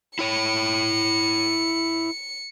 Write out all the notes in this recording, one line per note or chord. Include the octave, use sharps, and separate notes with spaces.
E4 C#5 C#7